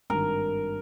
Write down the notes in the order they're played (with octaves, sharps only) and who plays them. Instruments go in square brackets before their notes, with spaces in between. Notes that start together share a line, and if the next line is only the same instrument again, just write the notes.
[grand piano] G#1 G2 D#3 [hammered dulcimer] A#4